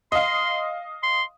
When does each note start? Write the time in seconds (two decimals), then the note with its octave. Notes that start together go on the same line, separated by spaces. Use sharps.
0.12 D#5 F5 C6
1.03 C6